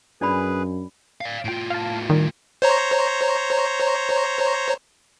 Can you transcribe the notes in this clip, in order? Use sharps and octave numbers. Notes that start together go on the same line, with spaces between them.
F#2 D4 G#4 B4 D5 B5
D5 F5
A2 F4 G5 D7
F5 A5
D#3 G3
C5 C#5 A#5